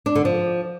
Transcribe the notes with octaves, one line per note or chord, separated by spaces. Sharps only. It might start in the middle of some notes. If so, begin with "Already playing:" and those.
D4
D3
F3